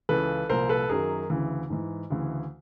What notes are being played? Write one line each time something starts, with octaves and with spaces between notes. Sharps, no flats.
C#2 C#3 E3 A4 B4
C2 A#2 F3 A#4 C5
A4 B4
F#2 D#3 F#3 G#4 A#4
D2 C#3 E3
G#2 E3
D2 C#3 E3